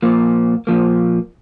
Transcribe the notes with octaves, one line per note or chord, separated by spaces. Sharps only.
A#2 F3 A#3
A#2 F3 A#3